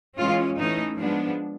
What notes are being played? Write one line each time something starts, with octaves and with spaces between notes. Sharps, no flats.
E3 G#3 C#4 F4
E3 A3 C#4 D#4
F3 G#3 B3 D4